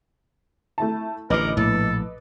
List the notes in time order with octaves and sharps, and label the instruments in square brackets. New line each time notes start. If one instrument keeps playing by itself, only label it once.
[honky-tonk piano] A3 E4 A5
[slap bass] A1 D3 [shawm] A#4 [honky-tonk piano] B4 D#5 D6
[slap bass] A#1 [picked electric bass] A2 [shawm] A4